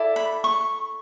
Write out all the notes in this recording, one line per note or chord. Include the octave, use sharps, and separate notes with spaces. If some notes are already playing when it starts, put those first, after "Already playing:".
Already playing: E4 A4 D5
B5
C#6